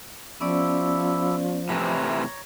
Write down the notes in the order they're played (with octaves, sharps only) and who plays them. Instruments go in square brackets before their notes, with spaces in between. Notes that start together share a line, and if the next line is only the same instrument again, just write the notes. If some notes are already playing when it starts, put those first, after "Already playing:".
[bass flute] F3 [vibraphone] B3 C#4 D5 [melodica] E4 G4 A4
[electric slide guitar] A2 C3 E3 [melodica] C#5 A#5 [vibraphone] B5